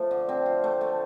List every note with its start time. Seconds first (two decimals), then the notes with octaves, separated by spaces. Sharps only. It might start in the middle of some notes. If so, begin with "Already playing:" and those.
Already playing: F3 A3
0.11 D3
0.29 C4
0.46 F4
0.64 A3
0.81 A3